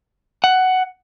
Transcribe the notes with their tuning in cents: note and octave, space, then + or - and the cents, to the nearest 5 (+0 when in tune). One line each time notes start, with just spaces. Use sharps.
F#5 +10